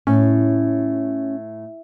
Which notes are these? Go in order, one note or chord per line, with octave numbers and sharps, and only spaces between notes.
A2 C#4